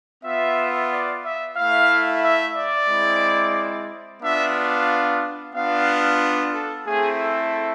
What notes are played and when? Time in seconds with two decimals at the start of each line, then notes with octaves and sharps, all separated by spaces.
0.24 B3 F4 E5
0.89 D5
1.23 E5
1.55 A3 E4 F5
2.21 E5
2.55 D5
2.88 G#3 C4 E4
4.21 B3 D4 F4 E5
4.54 F5
5.54 B3 D4 F4 F5
6.52 A4
6.86 A3 C4 E4 G#4
7.19 A4